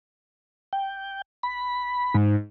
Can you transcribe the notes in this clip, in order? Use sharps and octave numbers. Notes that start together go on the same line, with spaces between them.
G5
B5
G#2